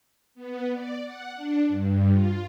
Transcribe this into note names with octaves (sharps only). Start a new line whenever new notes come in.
B3
D5
F#5
D4
G2
F4